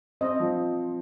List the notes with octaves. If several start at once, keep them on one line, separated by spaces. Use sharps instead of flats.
C4 D#5
F3